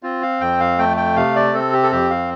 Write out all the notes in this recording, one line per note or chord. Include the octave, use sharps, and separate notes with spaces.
C4 F4
F5
F2 G5
F5
A3 G5
G5
C3 F5
D5
C4 A4
G4
A4
F2 G4
F5